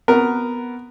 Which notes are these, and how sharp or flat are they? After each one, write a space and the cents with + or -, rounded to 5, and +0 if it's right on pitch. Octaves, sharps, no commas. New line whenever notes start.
B3 +0 F#4 +0 A#4 +0